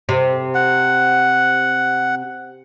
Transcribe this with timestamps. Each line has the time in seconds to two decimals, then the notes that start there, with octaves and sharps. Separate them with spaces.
0.09 C3
0.55 F#5